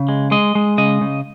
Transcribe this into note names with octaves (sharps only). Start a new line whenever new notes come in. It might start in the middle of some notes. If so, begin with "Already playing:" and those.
Already playing: C#3
G#3
G#3 D#5
G#3
C#3 D#5
C#3